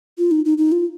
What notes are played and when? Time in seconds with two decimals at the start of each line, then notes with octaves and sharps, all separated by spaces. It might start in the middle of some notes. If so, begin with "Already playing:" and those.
0.18 F4
0.31 D#4
0.45 D#4
0.58 D#4
0.72 F4